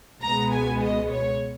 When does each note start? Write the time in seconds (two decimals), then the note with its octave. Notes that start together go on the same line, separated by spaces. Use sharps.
0.22 C#2 B2 G#3 B3 A#5
0.52 G#5
0.81 D#5
1.10 C#5